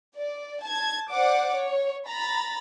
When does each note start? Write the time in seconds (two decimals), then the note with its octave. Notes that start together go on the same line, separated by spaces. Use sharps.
0.17 D5
0.63 A5 G#6
1.10 C5 D5 F#5 D6
1.54 C#5
2.07 A#5 B5 A6